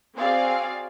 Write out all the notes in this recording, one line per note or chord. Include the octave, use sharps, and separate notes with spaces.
C4 F#4 G#4 D5 F5